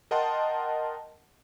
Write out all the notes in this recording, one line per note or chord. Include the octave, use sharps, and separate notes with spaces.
A#4 D#5 F#5 G5 A5 C6